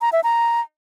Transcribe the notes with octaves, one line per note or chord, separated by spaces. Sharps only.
A#5
E5
A#5